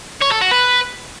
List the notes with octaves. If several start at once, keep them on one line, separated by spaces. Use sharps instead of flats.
C#5
A4
F#4
B4